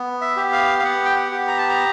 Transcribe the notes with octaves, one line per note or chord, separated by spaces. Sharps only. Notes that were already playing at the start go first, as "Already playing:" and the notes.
Already playing: B3
E5
G4
F5
F5
B3 F#5
G5
F#5
G4
A#5
A5
A#5